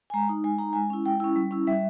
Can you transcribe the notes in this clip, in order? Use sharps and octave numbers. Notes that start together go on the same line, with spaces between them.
G#5
G#3 A#5
D#4
G#3 G#5
D#4 A#5
G#3 G#5
C#4 E4
G#3 G5
C#4 E4
G3
C#4 E4
G3 E5